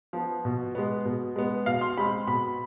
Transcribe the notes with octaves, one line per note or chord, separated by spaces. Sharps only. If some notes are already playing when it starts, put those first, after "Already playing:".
F3 B3
B2
G#3 B3
B2
G#3 B3
B2 F5
C6
G#3 C4 B5
B2 B5